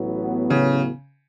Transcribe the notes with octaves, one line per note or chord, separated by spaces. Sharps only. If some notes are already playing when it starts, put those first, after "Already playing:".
Already playing: A1 A2 F#3 B3
C#3